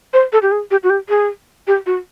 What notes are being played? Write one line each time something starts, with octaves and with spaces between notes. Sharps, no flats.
C5
A4
G4
G#4
G4
F#4
G4
G#4
G4
F#4